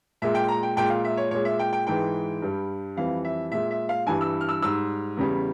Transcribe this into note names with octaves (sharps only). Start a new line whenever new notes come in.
A#2 G#3 E5
G5
A#5
G5
A#2 G#3 G5
F5
E5
C#5
A#2 G#3 C#5
E5
G5
G5
G#2 E3 G#3 G5
G2 G3
F2 E3 G3 F5
E5
A#2 G#3 E5
E5
F5
G2 E3 G3 G#5
E6
F6
E6
G#2 G3 E6
E2 C#3 G3